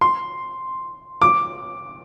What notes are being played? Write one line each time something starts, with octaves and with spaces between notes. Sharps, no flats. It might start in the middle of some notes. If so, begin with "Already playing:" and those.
C6
D6